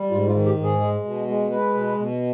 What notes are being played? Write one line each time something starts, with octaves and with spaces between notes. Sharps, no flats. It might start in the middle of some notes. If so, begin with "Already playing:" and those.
Already playing: G3
G#2 F4
F4
D#3
G4
G#2
G#4
G#3
B2
G#3
G#3 B4
B2
B2